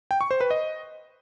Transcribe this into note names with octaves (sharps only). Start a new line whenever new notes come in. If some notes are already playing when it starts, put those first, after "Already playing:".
G5
C#6
C5
B4
D#5